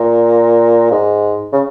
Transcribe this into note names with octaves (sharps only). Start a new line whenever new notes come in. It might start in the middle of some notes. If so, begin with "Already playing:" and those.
Already playing: A#2
G#2
C#3